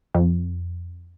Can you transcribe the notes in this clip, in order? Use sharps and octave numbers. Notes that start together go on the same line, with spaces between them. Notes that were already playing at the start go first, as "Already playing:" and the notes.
F2